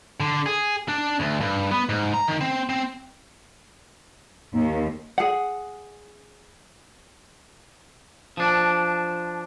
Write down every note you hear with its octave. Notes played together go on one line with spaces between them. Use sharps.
D3
G#4
D4
D2
G2
B3
G#2
A#5
D#3
C4
C4
D#2
G#4 F#5
F3 D4